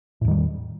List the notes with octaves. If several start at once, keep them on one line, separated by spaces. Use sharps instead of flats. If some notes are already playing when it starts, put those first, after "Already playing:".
E2 A2 D#3 G3